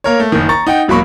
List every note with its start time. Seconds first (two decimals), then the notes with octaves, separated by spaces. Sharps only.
0.04 A#3 A#4 C#5
0.20 A3
0.32 F#1 D#3
0.49 A#5 C#6 A6
0.67 D#4 F#5 G5
0.88 E1 F#3 A#3 B5 C#6